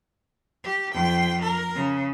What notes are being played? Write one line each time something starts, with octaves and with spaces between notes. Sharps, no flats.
G4
F2 G5
A#4
C#3